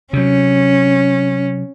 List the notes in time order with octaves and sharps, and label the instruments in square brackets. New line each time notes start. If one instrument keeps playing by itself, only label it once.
[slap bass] C3 F#3 [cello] C#4